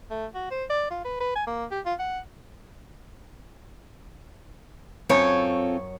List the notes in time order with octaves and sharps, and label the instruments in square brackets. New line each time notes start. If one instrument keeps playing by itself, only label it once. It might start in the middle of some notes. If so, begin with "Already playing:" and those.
[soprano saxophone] A3
F#4
C5
D5
F4
B4
B4
G#5
A#3
G4
F4
F#5
[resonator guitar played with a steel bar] F#2 C#5 [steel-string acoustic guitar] C4 F4 A4